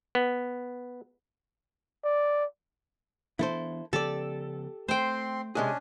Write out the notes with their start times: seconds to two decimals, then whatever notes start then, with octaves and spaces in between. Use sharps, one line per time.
0.15 B3
2.04 D5
3.39 E3 B3 D4 E4 A4 C5
3.93 C#3 F3 B3 G4 A4 D5
4.88 A3 C4 C5 G5 C6
5.55 C3 G#3 C#4 D4 G#4